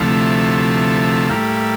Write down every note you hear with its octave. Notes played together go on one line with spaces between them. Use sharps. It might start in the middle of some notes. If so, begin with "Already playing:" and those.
Already playing: D2 C3 F3 A3 E4
A2 G3 A#3 E4